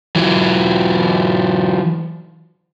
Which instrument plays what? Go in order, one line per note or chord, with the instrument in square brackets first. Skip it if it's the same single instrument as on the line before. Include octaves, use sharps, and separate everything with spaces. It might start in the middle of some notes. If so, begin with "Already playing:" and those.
[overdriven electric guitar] E3 F#3